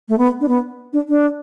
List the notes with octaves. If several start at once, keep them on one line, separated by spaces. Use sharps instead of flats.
A3
B3
D4
B3
D4
D4